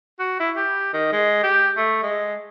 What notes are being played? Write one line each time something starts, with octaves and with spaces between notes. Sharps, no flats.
F#4
E4
G4
D#3
G#3
G4
A3
G#3